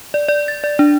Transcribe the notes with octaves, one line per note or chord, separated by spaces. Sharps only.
D5
D5
A6
D5
D4